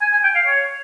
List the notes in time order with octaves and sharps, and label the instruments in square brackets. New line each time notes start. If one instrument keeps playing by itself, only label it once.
[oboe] G#5
G#5
G5
F5
C#5